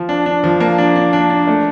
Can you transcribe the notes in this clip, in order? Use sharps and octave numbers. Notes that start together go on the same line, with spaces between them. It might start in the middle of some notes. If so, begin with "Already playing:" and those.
Already playing: F3
D4
D4
F3
A#3
D4
D4
D4
D4
A3